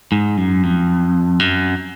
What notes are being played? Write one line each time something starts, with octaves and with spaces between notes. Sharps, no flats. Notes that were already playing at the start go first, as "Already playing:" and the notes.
G#2
F#2
F2
F#2